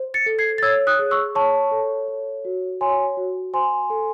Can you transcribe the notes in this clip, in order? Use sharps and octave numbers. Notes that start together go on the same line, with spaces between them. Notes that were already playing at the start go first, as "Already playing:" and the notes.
Already playing: C5
A6 C#7
A4
G#6 C7
A6
C#5 E6 G#6
D#6 F#6
G#4
C#6 E6
C#5 A5 C#6
A4
C#5
F#4
C#5 G#5 C6
F#4
C5 G#5 C6
A4